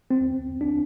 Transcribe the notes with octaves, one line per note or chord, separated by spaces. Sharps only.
C4
D4